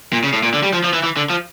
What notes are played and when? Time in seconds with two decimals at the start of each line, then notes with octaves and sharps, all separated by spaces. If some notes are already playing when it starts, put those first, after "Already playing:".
0.13 A#2
0.24 C#3
0.33 A2
0.43 A#2
0.54 D3
0.63 G3
0.73 F3
0.84 F3
0.93 E3
1.03 E3
1.17 D3
1.30 F3